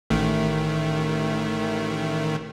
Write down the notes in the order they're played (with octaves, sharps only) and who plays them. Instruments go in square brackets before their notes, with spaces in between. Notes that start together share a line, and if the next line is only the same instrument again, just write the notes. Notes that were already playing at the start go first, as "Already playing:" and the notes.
[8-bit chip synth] A1 D#3 A3